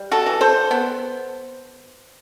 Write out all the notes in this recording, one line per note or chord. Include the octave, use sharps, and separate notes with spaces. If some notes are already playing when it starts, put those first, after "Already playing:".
Already playing: G3
F#4 A4
E3
A4 C5
B3